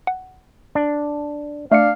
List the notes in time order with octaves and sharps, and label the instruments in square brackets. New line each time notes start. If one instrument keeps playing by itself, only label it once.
[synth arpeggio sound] F#5
[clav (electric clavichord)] D4
[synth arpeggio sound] A3 C#7 [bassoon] D4 [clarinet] F5